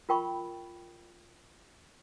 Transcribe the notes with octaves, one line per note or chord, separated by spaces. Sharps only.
F4 A#4 G5 B5 C#6